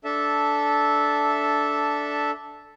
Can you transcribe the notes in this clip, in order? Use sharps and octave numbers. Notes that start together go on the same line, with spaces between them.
D4 A4 E5 A5